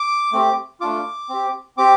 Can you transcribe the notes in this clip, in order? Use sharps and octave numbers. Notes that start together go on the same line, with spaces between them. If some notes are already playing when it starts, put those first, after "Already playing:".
Already playing: D6
A3 C4 G4
A3 D4 F4 D6
C4 G4
C4 G4 D6